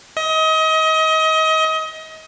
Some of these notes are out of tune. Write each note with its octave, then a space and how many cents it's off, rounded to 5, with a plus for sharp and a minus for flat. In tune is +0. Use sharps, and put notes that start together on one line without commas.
D#5 +30